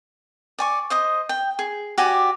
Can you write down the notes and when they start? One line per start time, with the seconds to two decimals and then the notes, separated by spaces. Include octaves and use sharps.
0.59 D5 G#5 C#6
0.90 C5 D#5 D#6
1.29 G5
1.59 G#4
1.98 F#4 G4 D5 G#5